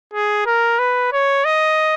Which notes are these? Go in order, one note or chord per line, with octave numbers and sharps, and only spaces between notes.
G#4
A#4
B4
C#5
D#5